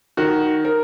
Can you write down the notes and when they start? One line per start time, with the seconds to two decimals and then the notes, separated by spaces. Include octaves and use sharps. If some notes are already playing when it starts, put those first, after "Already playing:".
0.17 D#3 F#4
0.65 A#4